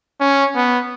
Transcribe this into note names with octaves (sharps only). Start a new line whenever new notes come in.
C#4
B3